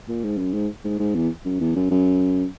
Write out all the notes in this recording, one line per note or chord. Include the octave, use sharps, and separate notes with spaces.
A#2
G#2
F#2
G#2
G#2
G#2
E2
F#2
E2
F#2
F#2